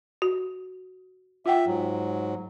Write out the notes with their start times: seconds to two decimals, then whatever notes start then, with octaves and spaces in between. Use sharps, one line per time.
0.22 F#4
1.46 F4 E5 F#5 G5
1.67 G#2 F#3